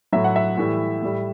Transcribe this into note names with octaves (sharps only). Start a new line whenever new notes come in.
A2 F#3 E5
F#5
E5
A2 E3 G3
A2 G3